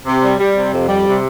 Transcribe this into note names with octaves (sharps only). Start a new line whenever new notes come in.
C3
G3
G3
C3
F2
G3
C3